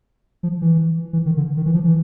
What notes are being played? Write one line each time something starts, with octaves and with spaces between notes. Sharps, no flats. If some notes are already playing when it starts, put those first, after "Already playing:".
F3
E3
E3
D#3
D3
D#3
E3
F3
E3